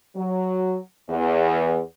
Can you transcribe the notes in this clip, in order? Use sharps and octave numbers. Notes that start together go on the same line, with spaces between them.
F#3
E2